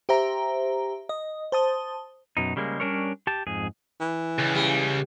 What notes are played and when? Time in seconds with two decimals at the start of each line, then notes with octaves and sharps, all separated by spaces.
0.09 G4 C5 E5 A#5
1.09 D#5
1.52 C5 A5 D#6
2.37 F#2 B2 D#4
2.56 C#3 G3 G#3 A#3
2.80 G3 C#4 D4 A#4 C#5
3.27 G4 A5
3.47 F2 G#2 G#4
4.01 E3
4.39 C#2
4.55 G3